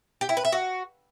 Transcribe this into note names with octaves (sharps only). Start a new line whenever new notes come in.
G4
E4
B4
E5
F#4